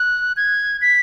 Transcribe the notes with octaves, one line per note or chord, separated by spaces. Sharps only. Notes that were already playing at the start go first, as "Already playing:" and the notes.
Already playing: F#6
G#6
B6